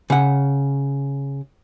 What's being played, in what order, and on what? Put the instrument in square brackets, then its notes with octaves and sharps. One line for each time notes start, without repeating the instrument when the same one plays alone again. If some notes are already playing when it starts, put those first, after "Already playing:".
[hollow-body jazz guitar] C#3 F#5